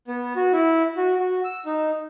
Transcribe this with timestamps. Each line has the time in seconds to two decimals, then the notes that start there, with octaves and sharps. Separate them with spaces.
0.08 B3
0.36 F#4
0.53 E4
0.97 F#4
1.20 F#4
1.44 E6
1.66 D#4